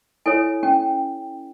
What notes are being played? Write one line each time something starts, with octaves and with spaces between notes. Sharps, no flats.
E4 A4 C#5 G#5
C#4 G5